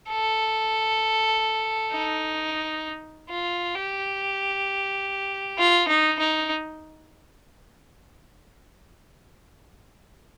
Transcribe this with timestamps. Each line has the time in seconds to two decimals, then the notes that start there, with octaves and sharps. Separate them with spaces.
0.10 A4
1.93 D#4
3.30 F4
3.75 G4
5.59 F4
5.88 D#4
6.19 D#4